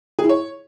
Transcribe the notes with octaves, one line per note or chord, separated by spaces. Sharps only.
G#4
E4
C#5